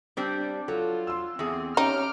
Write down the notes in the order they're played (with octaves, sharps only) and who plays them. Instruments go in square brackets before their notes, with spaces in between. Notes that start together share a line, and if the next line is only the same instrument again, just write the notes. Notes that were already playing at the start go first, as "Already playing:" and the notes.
[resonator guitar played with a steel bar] G3 C4 D4
[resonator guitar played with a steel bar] F#3 [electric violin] F4 [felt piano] A4
[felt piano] C6 E6
[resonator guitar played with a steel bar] E2 G#4 [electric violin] C4
[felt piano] C#4 E5 [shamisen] D#4 [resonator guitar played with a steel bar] G4 [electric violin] F6 D7